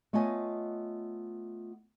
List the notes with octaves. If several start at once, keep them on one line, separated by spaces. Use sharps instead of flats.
A3 B3 F4 C#5 D#5 G#5